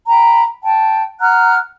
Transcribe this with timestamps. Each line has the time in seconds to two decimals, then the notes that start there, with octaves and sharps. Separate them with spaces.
0.07 G5 A#5 B5
0.63 G5 A5
1.20 F#5 A#5 F6 F#6